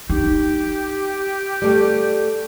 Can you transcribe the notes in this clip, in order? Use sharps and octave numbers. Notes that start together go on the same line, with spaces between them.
D#4 G4
G3 A3